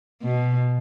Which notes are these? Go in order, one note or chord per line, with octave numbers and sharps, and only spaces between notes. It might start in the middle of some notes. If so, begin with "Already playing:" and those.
B2